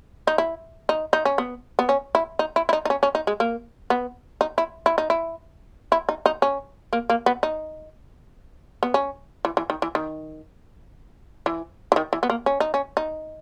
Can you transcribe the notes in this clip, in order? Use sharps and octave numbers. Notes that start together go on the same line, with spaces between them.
D#4
E4
D#4
D#4
C#4
B3
B3
C#4
E4
D#4
E4
E4
D#4
D#4
C#4
C#4
D#4
G#3
A#3
B3
D#4
E4
E4
D#4
E4
E4
D#4
D#4
C#4
A#3
A#3
B3
D#4
B3
C#4
E3
E3
D#3
E3
D#3
E3
E3
D#3
E3
B3
A#3
C#4
D#4
C#4
D#4